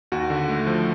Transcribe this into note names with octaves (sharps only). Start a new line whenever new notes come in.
D#2 F#4
D3
A3
F3